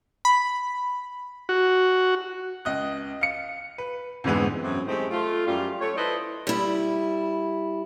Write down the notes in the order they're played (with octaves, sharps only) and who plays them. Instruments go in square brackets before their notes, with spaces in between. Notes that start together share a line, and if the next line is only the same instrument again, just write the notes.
[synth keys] B5
[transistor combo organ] F#4
[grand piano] C#2 D#5 F#6
F5 C#7
B4
F2 G#2 D3 E3 G#3 B3
[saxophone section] F#2 A2 C4
G#3 A3 C4 D#4 E4 G4
A3 F4
F#2 G3 F4
A3 C#5
E4 A4 B4 C5 D5 D#5
[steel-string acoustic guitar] G3 E4